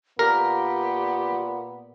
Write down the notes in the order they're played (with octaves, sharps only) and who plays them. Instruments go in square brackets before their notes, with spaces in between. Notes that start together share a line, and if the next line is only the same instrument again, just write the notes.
[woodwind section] A#2 [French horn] B3 [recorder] G4 [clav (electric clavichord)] A#4